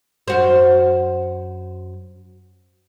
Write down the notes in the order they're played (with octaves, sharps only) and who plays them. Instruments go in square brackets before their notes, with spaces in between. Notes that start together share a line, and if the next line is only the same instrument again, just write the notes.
[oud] F#2 F#4 C5